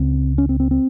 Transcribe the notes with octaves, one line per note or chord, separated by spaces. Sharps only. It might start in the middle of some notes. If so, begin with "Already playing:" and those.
Already playing: C#2 C#3 C4
C#4
C4
C4
C4